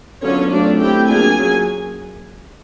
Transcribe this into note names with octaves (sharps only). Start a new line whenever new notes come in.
D3 F#3 B3 C#4 D4 F4 C#5
F#3 A3 C4 D4 F4 D5
A3 C4 E4 G4 G5
F#3 A#3 D4 F4 G#4 G#5
F#3 A#3 C#4